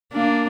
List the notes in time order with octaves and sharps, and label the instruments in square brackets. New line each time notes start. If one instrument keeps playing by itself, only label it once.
[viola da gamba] A#3 D4